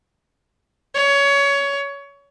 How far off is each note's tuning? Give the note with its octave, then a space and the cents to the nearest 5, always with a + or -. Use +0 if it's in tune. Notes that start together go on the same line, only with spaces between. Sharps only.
C#5 +20